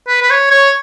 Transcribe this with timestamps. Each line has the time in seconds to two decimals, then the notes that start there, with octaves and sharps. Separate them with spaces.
0.08 B4
0.22 B4
0.31 C#5
0.51 C#5